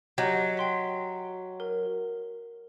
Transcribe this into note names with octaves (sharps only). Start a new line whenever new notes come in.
F#3 G4 D#5 G6
G5 C6 B6
A#4